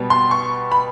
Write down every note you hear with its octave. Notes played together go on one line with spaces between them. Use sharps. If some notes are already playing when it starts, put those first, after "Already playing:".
Already playing: B2 G3 B3
C6
C#6
B5